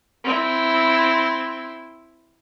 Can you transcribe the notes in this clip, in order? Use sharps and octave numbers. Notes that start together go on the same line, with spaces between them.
C4 E4